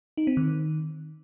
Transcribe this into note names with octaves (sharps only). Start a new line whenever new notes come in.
D#4
C4
D#3